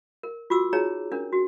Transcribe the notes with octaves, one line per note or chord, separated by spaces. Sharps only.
A#4
F4 F#4 D6 E6
D#4 G#4 C#5 A#5
C#4 D4 A#4
F#4